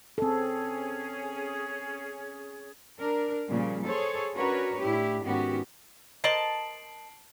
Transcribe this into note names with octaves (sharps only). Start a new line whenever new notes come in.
C4 C#4 G#4 A4
D4 A#4
A#2 C#3 F3 G3
G#4 A4 C5 C#5
C#4 D4 F#4 A#4 B4 C#5
A2 D4 E4 G4
G#2 D#3 B3 C#4 F#4 G4
A#4 C5 D#5 A5 C7 D7 F#7